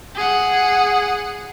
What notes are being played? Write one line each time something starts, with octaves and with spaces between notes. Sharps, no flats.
G#4 F#5